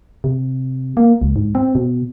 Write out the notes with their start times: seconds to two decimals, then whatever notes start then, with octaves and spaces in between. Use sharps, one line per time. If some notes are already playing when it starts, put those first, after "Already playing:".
0.24 C3
0.97 A#3
1.22 C#2
1.36 G#2
1.55 C4
1.75 B2